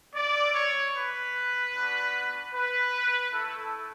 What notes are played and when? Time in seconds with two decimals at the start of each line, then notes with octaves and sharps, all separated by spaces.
0.14 B3 E4 D5
0.53 C#5
0.94 B4
1.73 B3 D4 F#4
2.54 B4
3.33 A3 E4 A4